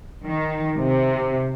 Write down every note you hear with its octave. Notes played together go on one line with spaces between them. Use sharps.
D#3
C3